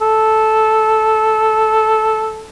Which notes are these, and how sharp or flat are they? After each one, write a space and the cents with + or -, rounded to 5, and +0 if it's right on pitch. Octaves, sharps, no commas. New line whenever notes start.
A4 -10